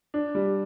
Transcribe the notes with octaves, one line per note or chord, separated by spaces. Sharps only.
D4
G3